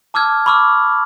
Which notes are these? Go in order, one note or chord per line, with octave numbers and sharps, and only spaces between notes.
A5 D6 E6 F6 G#6
B5 C#6 D6 E6 F6